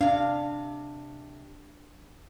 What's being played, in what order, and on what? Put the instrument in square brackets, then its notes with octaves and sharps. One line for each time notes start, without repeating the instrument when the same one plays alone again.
[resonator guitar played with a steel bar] C3 F5 [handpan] D4